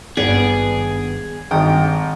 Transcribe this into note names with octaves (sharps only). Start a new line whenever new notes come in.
G#1 G2 B3 G#4 D5
G#1 G2 G5 D#6